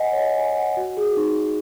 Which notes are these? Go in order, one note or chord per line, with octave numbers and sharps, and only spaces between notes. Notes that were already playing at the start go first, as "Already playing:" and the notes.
Already playing: D#5 F#5 G#5
C#5
D#5
G#5
F#5
F#4
G#4
F#4
D#4